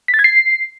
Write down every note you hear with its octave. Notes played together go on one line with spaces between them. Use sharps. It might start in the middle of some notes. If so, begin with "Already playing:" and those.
B6
A6
G#6
C7